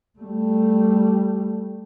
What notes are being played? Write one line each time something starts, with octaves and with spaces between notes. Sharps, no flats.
G3 A3